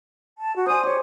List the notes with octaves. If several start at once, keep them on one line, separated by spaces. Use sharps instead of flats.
A5
F#4
C5 D5 G#5 D#6
G4 G#4 C#5